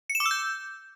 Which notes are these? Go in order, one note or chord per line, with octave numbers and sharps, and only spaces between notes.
C#7
E7
D6
E6
G6